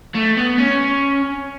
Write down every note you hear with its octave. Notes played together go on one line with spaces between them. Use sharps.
A3
B3
C#4